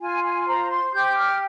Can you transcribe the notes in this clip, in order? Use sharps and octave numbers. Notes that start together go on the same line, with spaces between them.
F4 G#5
G#5
C6
C5 A#5
C6
G4 G6
F6